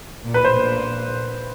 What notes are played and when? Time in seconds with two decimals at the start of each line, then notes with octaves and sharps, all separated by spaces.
0.24 A#2
0.34 B4
0.45 C5
0.53 A#2